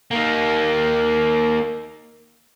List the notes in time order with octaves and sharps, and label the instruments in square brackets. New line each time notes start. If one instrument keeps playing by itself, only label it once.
[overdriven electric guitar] A#3 D#4